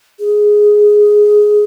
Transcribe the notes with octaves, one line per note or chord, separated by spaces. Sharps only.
G#4